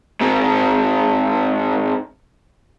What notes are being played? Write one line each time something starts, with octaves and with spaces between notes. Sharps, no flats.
G#2 C4